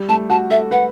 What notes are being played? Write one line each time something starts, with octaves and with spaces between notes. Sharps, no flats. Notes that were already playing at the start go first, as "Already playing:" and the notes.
Already playing: G3
A3 A5
F#4 A5
A4 E5
B4 F#5